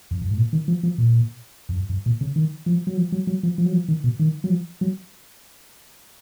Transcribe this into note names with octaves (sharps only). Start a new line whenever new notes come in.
F2
F#2
G#2
A#2
D#3
F3
F3
A#2
F2
F#2
F#2
A#2
C#3
D#3
F3
F#3
F3
F#3
F#3
F3
F3
F#3
F3
D#3
B2
D#3
F#3
F3
F#3